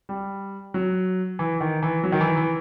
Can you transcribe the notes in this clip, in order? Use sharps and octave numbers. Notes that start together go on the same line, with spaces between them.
G3
F#3
E3
D#3
E3
F#3
D#3
E3
E3